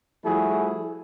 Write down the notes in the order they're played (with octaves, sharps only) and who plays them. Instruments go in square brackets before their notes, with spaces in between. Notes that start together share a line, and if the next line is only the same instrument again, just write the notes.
[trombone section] F3 G3 A3 E4 F#4 G#4